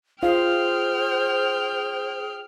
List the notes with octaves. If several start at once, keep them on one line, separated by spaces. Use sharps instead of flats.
F4 G#4 C5 F5 G5 F6